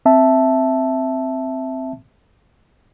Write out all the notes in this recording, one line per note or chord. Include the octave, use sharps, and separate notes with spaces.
C4 E5 A5